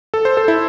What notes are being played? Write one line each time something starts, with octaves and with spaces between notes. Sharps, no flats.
A4
C5
A4
E4